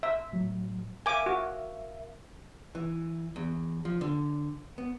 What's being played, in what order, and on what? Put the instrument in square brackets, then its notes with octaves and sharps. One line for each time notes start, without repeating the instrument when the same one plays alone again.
[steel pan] E5
[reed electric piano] A2 F#3
[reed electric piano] A#4 E5 F5 [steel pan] G#5 D6
[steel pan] F#4
[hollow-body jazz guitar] E3
E2
F3
D3
B3